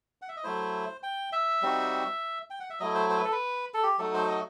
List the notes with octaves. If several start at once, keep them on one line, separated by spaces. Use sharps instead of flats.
F#5
E5
D#5
F#3 A3 E4 C5
G5
E5
G3 C4 D#4 F#4
G5
F#5
E5
F#3 A3 E4 D#5
C5
C5
B4
A4
B4
A4
G4
F#3 A3 D#4 F#4 A4
C5
D#5